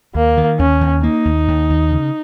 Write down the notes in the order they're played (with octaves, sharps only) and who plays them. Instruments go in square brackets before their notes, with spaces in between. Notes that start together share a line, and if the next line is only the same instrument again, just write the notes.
[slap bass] D#2 [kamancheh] A#3
[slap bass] D#3
[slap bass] D#2 [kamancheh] C#4
[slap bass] D#2
[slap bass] A#3 [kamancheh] D#4
[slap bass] D#2
D#2
D#2
C#3